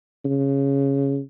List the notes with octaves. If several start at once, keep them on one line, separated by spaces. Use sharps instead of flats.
C#3